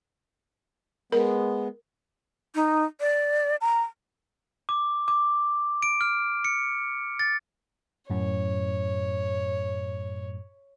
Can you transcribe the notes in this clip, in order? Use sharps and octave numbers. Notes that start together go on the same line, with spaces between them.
G#3 B3 A#4
D#4
D5
A#5
D6
D6
D7
F6
C#7
A6
F#2 A2 C#5